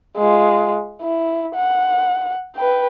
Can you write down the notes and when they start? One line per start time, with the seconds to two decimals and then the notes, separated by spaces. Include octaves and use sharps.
0.17 G#3 F4
1.01 E4
1.55 F#5
2.56 B4 G5